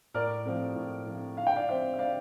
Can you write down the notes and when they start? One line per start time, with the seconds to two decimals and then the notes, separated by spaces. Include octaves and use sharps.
0.14 A2 A#4 D5
0.45 F3 A3 C4
0.76 A2
1.07 F3 A3 C4
1.37 D3 F5
1.47 G5
1.56 D5 F5
1.69 F3 C4 C5 E5
1.94 E5
1.99 D3 D5 F5